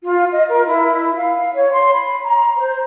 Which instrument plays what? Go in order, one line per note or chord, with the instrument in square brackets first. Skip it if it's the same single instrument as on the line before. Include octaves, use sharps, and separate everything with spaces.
[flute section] F4
D#5
A#4
E4
F5
C#5
C6
B5
A#5
C5